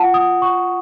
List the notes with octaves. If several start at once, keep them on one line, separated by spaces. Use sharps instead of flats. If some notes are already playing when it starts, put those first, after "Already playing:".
Already playing: F4 F#5 A5
D#6
C#6